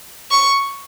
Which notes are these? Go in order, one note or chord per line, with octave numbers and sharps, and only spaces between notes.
C#6